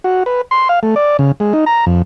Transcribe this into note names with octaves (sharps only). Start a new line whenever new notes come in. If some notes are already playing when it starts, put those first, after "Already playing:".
F#4
B4
C6
F5
A3
D5
C#3
G#3
D#4
A#5
F2